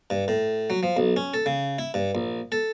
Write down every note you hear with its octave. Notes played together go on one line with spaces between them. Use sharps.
G2
A2
F#3
F3
B1
C#4
A4
C#3
E4
G2
A#1
A4